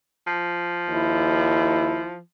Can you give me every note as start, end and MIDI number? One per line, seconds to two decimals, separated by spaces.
0.27 2.19 53
0.89 2.05 39
0.89 2.15 64